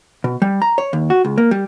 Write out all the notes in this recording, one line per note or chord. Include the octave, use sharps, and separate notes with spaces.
B2
G3
A#5
C#5
D#2
F#4
C#2
A#3
G3